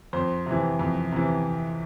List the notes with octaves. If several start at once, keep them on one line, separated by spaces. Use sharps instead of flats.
F2 C5
C3 E3
F2
C3 E3